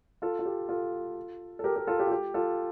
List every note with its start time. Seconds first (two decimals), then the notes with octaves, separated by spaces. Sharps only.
0.22 F4 A4
0.39 F4
0.45 G4
0.69 F4 A4
1.59 A4
1.64 G4 A#4
1.76 G4 A#4
1.87 F4 A4
1.99 G4
2.07 F4
2.12 G4
2.34 F4 A4